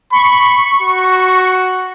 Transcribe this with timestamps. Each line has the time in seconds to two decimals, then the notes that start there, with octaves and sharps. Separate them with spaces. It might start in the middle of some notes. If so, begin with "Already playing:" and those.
0.13 B5 C#6
0.82 F#4